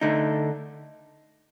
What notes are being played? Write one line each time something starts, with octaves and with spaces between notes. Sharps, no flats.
D3 A3 D#4